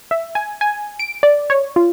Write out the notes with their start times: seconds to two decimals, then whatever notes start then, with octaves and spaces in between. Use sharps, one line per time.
0.11 E5
0.35 G#5
0.61 G#5
1.00 D7
1.23 D5
1.50 C#5
1.76 F4